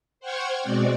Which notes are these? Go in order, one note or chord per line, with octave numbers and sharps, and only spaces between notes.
C5 F#5 G5 C#6 F6 G#6
B2 G#3 C4 F#4 D5